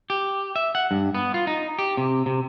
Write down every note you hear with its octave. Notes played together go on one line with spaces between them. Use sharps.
G4
E5
F#5
G2
B3
F4
D#4
G4
C3
C3